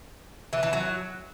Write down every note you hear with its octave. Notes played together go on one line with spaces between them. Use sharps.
E3
E3
F#3